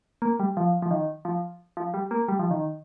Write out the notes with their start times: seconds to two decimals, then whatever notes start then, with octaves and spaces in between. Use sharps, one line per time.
0.22 A#3
0.40 G3
0.57 F3
0.82 F3
0.91 D#3
1.25 F3
1.77 F3
1.94 G3
2.11 A#3
2.28 G3
2.39 F3
2.51 D#3